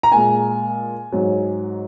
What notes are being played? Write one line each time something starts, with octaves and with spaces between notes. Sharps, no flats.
A#5
A#2 G#3 G#5
G#2 F#3